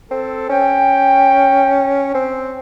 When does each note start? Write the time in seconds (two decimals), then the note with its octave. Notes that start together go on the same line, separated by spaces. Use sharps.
0.11 C4 A4
0.50 C#4 G5
2.15 C4